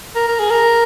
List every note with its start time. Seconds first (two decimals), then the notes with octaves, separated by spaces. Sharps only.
0.15 A#4
0.28 A#4
0.39 G#4
0.50 A#4